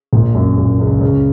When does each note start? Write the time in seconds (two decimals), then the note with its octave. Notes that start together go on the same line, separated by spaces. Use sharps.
0.13 A#1 A#2
0.34 F#2
0.57 A#1 A#2
0.80 C#2 C#3
1.01 C#2 C#3